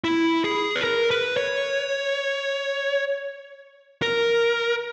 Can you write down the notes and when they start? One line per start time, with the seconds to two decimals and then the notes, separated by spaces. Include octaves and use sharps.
0.04 E4
0.44 G#4
0.76 B4
0.84 A#4
1.11 B4
1.37 C#5
4.02 A#4